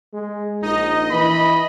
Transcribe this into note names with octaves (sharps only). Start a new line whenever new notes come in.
G#3
A#1 D#4 D#5
E3 B5